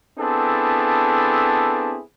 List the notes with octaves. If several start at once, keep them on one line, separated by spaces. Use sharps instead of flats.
B3 C4 D4 E4 G#4 A4